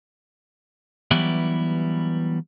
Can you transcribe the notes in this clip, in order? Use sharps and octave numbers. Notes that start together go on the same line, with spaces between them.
E3 F#3 G3 B3 E4 G4